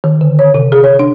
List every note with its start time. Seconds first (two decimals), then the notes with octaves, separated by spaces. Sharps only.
0.04 D#3
0.21 D3
0.39 C#5
0.54 C3
0.72 G#4
0.84 C#5
0.99 D4